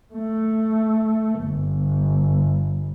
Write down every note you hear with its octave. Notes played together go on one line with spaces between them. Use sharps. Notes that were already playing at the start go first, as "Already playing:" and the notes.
A3
G1